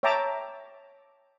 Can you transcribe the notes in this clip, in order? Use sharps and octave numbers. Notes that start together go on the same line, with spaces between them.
C#5 E5 G5 A5 A#5 D6